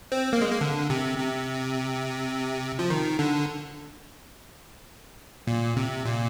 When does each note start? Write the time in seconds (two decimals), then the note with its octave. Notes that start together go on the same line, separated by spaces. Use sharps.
0.12 C4
0.33 A#3
0.41 G#3
0.51 A#3
0.61 D3
0.90 C3
1.18 C3
2.79 F3
2.90 D#3
3.19 D3
5.47 A#2
5.76 C3
6.05 A#2